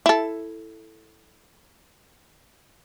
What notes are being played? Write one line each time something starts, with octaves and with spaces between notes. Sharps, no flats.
E4 A4